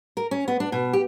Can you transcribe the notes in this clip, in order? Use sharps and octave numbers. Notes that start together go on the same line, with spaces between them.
A#4
C#4
B3
D4
B2
G4